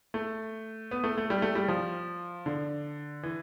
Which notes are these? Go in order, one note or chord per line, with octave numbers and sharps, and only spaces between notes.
A3
B3
A3
A3
G3
A3
G3
F3
D3
E3